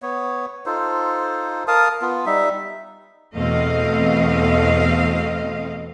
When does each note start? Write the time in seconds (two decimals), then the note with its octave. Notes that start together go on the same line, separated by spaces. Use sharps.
0.02 B3 C#5
0.66 D#4 F4 A4 C5
1.68 A#4 F5 A5 D#6
2.01 B3 F4
2.26 G3 D#4 E5
3.34 E2 B2 A3 C4 D#5 F5